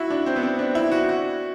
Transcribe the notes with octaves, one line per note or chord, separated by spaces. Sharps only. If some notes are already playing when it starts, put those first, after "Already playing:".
Already playing: E4 F#4
D4
C4
B3
C4
D4
E4
F#4
F#4